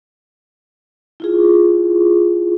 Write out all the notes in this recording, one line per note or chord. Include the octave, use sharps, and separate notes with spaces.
E4 F4 G#4